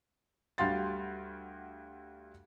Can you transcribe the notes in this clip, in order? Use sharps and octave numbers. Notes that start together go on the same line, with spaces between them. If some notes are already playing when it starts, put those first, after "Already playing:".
D2 G3 F#4 F5 C6 A6